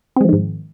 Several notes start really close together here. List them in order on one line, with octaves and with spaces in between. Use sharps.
C4 G#3 F3 D#3 G#2